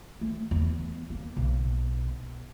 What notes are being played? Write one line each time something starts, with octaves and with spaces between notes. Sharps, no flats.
A3
E2
A#3
B1